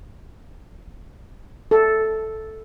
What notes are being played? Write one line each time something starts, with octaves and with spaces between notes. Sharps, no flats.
A4